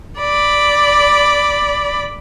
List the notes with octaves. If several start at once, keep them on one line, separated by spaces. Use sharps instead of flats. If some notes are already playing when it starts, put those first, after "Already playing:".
D5 B5